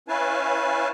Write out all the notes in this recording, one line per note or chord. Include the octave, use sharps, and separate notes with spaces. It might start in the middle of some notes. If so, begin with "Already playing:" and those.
C#4 E4 B4 F5 G#5 A5